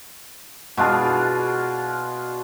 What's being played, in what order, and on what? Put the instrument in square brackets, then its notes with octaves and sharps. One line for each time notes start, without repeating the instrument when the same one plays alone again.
[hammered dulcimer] B2 D4 F4 G#4